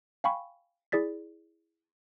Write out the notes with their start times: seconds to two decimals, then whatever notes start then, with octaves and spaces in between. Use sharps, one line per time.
0.24 F5 G5 G#5 B5 C#6
0.92 E4 G#4 D5 A6 B6